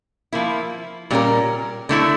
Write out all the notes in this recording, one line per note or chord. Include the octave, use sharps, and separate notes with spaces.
F3 A#3 E4
A#2 G3 C#4 F4 A#4
D3 A3 E4 A4